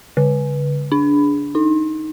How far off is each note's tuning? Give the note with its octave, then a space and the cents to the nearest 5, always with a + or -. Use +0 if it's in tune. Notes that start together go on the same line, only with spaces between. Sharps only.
D3 -45
D4 -15
D#4 +5